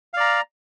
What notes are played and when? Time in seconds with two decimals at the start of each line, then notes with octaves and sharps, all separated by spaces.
0.13 F5
0.17 D5
0.20 A#5